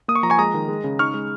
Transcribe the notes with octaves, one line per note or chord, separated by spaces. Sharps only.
A#3 D#6
C#6
F3 A#5
G#5 C#6
G#3 A#5 D#6
D#3
G#3
C#3
D#4 C#6 F6
G#3